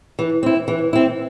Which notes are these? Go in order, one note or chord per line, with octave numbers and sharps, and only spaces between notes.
E3
C4 E4
E3
C4 E4